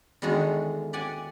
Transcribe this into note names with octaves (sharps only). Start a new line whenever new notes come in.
E2 D3 D#3 G#3 F#4
G4 D5 F#5 G#5